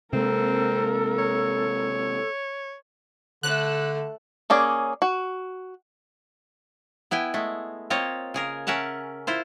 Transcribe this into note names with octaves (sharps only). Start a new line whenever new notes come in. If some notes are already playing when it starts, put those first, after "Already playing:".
C3 G#3 A#3 C4 A4 A#4
C#5
D3 A3 A4 F#6
A#3 C#4 G#4 D5
F#4
B3 E4 G5 G#5
G#3 A3
A#3 C4 F4 C#5 D#5
C#3 G#4 A#4
C#4 A#4 E5 F#5 A5
E4 F4 C5